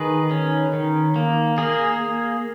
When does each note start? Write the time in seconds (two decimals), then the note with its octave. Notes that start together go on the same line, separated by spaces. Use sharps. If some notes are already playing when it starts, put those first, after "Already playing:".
Already playing: D#3 G#4 B4
0.31 C#4
0.73 D#3
1.16 A#3
1.58 A#3 G#4